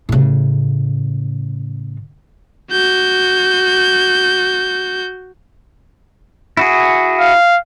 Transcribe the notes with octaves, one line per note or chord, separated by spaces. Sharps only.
A2 C#3
F#4 G6
E4 F#4 G#4
F5